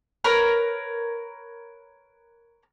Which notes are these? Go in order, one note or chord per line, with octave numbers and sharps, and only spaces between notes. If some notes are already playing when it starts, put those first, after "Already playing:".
A#4 B4 C#5